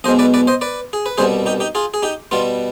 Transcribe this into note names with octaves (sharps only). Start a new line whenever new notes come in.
B1 B2 G#3 C5 D#5
B4 D5
B4 D5
C5 D#5
B4 D5
G#4
B4
C2 B2 G3 B3 G#4 C5
D#4 G4
D#4 G4
F4 G#4
G#4
D#4 G4
B2 G3 B3 F4